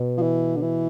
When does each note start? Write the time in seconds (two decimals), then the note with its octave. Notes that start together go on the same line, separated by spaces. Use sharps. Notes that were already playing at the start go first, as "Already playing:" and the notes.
Already playing: B2
0.17 F3
0.22 E3
0.56 D3
0.62 E3